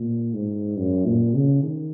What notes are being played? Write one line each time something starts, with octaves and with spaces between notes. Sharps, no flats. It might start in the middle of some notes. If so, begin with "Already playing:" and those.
Already playing: A#2
G#2
F#2
A#2
C#3
D#3